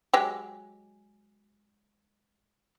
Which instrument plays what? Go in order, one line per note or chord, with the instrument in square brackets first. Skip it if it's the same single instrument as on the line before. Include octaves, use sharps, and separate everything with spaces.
[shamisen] F#3 G#3 G4